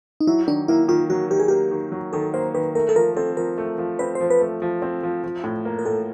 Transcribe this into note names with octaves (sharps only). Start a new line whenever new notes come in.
D#4
F#3 E4
D#3 D4
A#3 E4
D#3 F4
F#3 F#4
D#3 G4
G#4
A#3 G4
D#3
F#3
D#3 A4
A#3 C5
D#3 B4
A3 A#4
A4
F3 A#4
C4 A4
F3 A#4
A3
F3
C4 B4
C5
F3
B4
A3
F3
C4
F3
F3
A2
A#3
A#4
A2 A4